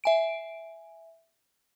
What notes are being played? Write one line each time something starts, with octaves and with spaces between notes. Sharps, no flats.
E5 G#5 D7